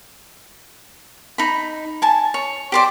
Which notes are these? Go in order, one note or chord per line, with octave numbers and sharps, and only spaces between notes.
D#4 B5
G#5 A5
C#5
G4 C5 D5